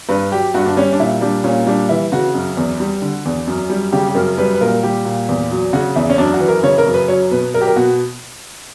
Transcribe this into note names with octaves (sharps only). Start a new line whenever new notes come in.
G2 B4
F#3 G4
G2 F#4
D4
G3 C#4
D4
A#2 E4
G3 D4
A#2 C#4
G3 D4
E3 E4
C#3 F#4
F#2
E2
G3
D3
E2
F#2
G3
C#3 G4
G4
F#2 A#4
G3 B4
B4
A#2 A#4
G3 G4
A#2
E2
F#3
C#3 F#4
E2 E4
C#4
F#2 D4
F#4
E3
A#4
C#3 C#5
A#4
F#2
B4
F#3 C#5
B2 B4
F#3 A#4
G4
A#4
B2 F#4